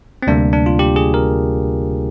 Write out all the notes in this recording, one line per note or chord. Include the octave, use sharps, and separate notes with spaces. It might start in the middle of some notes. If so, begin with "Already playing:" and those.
C4
D2 C3 G3 A#3 D4
D4
F4
G4
G#4
A#4